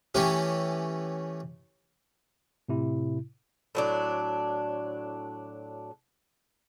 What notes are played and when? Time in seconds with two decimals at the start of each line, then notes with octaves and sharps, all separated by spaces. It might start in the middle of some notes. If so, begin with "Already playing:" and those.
0.15 E3 A3 C#4 G4
2.69 A2 C3 E4
3.75 A2 F#3 D4